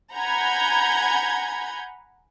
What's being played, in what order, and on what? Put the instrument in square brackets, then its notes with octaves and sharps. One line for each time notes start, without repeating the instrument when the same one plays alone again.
[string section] F#5 G#5 A#5 B5 G6 G#6